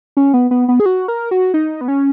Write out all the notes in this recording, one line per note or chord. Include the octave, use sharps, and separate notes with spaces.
C#4
B3
B3
B3
G#4
F#4
A#4
F#4
D#4
B3
C#4